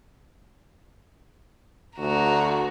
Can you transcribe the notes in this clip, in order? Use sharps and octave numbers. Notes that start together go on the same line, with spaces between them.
D2 F#4 A#5